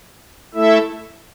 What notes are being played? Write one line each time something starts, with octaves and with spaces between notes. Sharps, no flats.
A3 E4 A4 E5